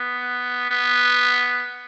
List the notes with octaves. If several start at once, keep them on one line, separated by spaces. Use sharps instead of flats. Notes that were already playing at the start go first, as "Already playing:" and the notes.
Already playing: B3
B3